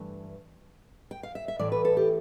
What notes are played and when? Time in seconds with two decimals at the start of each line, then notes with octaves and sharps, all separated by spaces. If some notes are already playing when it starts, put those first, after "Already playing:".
Already playing: G2 E3 A3
1.11 G5
1.23 F5
1.35 E5
1.48 E5
1.59 A2 E3 A3 D5
1.72 B4
1.85 A4
1.97 G4